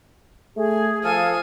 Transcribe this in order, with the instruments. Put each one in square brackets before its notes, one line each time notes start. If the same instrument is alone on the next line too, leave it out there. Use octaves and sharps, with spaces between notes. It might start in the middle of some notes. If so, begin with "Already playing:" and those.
[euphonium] A3 [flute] G#4
[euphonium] F3 [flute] A4 [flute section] F5 D#6 F6 [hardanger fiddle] G#5